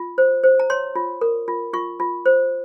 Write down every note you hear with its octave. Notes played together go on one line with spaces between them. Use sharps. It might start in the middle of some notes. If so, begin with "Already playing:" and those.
Already playing: F4
C5
C5
A#5
C#5 C6
F4
A#4
F4
F4 C#6
F4
C5